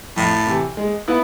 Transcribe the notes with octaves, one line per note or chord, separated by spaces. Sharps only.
F2 A2
C3 E3
G#3
B3 E4 B4